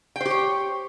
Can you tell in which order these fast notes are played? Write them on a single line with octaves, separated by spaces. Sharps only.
G5 C5 G4 C#5